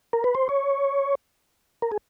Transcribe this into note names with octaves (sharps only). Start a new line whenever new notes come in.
A#4
B4
C5
C#5
A#4
G#4